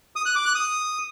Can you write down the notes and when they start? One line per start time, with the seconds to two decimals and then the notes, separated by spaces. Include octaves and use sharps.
0.16 D#6
0.26 F#6
0.35 D6
0.45 F#6
0.55 D#6